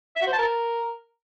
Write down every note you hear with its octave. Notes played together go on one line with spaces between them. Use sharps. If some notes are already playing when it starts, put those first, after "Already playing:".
E5
F#4
C5
A5
A#4